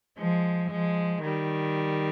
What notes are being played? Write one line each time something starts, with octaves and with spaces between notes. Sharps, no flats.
F3 G#3
F3 G#3
D#3 G3